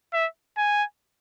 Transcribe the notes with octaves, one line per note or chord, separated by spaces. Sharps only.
E5
G#5